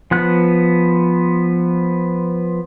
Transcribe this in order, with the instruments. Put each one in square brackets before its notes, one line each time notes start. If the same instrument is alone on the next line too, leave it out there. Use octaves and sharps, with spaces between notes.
[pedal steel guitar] F3 B3 F#6